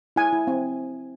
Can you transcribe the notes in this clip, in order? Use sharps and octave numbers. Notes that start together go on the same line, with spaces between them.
E4 G#5
E4
C4